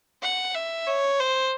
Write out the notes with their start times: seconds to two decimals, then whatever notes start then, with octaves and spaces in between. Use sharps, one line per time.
0.22 F#5
0.55 E5
0.87 C#5
1.20 C5